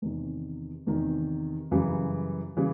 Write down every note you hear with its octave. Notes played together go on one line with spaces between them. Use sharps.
E2 C3 D#3
E2 C3 D#3
F#2 C#3 E3 G3
C#3 E3 G3